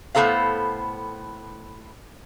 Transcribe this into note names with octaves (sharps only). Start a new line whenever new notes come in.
A2 A#3 B3 A4 C5 F5